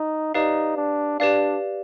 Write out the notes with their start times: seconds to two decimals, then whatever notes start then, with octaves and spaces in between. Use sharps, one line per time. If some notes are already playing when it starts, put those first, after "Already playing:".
Already playing: D#4
0.34 D#4 G4 B4 D5 F5
0.77 D4
1.19 D4 G4 B4 D5 F5